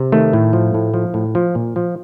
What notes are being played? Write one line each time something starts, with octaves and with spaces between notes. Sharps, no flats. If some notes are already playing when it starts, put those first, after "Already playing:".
Already playing: C3
D#3 A3
A2
F3
A2
F3
A2
F3
A#2
F3